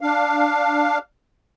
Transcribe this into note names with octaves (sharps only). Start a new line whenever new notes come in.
D4 F5